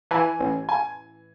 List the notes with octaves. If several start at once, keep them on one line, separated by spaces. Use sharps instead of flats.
E3 G#5
A1
G#5